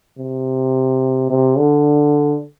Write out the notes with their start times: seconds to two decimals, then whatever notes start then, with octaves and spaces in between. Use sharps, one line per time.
0.18 C3
1.30 C3
1.57 D3